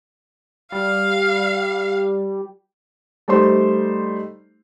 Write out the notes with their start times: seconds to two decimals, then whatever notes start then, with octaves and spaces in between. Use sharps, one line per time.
0.72 G3 F5
3.28 G3 A3 D#4 C5 C6